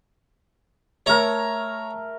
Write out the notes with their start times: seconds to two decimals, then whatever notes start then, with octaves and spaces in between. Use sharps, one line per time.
1.06 A3 A#4 C#5 A#5